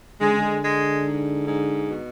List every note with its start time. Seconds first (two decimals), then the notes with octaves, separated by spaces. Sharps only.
0.20 D3 G#3
0.30 C#3
0.39 D3
0.61 G#3
1.04 G#2
1.45 G#2
1.87 B2